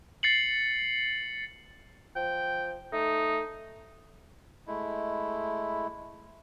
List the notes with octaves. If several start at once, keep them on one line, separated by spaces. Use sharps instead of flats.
A6 C7 C#7 F#7
F3 G5
A3 D#4
G#3 A3 E4